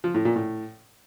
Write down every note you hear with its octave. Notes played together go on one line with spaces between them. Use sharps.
F3
A2
A#2
A2